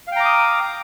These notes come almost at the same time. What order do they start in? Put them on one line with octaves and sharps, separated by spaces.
F5 G5 A#5 D6 D#6